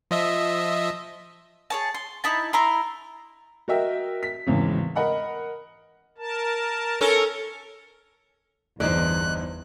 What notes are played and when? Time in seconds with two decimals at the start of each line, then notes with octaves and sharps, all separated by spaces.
0.11 F3 D#5 E5
1.70 G#4 C#5 A5
1.94 C6
2.24 D#4 E4 A5
2.53 E4 A#5 C6
3.68 F#4 A#4 D#5 E5 G5
4.23 B6
4.46 G#1 E2 C#3
4.96 A#4 D#5 F#5 B5
6.18 A#4 A5
7.01 C#4 A4 A#4
8.80 G1 E2 E3 D#4 C5 D5 F#6